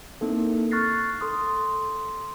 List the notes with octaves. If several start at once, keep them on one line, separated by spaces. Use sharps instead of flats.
A#3 C4 D#4 E4 A4
C#6 F6 F#6 A6 A#6 C7
A4 C6 D#6